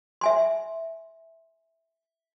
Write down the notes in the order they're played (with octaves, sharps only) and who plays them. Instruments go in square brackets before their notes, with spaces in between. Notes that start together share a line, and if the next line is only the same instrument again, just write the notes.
[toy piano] E5 G#5 C6